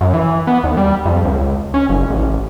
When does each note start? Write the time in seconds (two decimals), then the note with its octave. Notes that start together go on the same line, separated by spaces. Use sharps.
0.01 F#2
0.14 E3
0.47 B3
0.64 D#2
0.77 G3
1.05 F2
1.25 C#2
1.74 C#4
1.89 F#1
2.10 A1